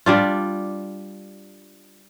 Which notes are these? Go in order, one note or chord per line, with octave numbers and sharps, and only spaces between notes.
G3 D4 F4